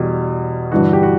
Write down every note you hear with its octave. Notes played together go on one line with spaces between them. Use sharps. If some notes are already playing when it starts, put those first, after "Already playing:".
Already playing: E2 B2 G3
G1 G2 E3 G3 F#4
G4
F#4